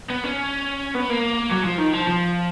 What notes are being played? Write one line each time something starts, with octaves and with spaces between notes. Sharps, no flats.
B3
C#4
B3
A#3
F#3
F3
D#3
F3
F3